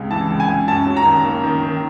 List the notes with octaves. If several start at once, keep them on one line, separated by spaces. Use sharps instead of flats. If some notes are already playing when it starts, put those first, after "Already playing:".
Already playing: C#2 C3 G#3
E3 A5
C#2
G#5
C#2
F#2 A5
F#3
A#5
D#3
A#3
D#3
D#3